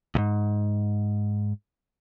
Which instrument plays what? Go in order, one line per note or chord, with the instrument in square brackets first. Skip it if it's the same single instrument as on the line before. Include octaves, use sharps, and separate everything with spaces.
[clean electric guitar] C#2 G#2